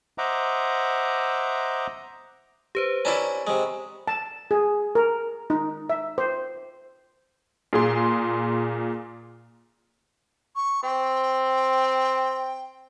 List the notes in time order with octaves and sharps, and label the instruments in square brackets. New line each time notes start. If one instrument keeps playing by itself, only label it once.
[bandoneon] C5 D#5 E5 F#5 A#5 D6
[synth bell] G4 B4 C5
[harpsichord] C#4 D4 E4 [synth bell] A#5 B5 C#6
[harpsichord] C3 G#3
[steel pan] A5
G#4
A#4
D#4
E5
C5
[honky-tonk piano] A#2 G#4 C6
[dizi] C#6
[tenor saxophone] C4 [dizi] G5